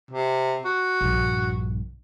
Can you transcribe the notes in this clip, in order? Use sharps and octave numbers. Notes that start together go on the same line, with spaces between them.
C3
F#4
A#1 G2